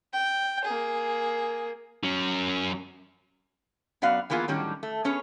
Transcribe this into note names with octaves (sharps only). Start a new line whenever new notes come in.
G5
A#3 G#4
F#3 C#4
F#2 B3 F#4 D5 F5
E3 A#3 B3 F4 G#4
A2 D#3 F#3 G3 C#4 G4
A3
B3 C#4 G#4 C#5